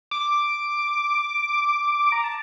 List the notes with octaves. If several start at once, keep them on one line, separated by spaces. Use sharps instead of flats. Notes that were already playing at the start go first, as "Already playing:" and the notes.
D6
A#5
A5